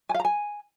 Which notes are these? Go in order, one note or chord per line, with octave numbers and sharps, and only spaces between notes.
G#5
F5
A#5
G#5